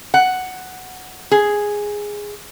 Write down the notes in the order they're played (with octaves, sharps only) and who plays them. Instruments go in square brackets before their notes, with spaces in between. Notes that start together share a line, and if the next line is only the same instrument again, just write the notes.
[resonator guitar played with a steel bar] F#5
G#4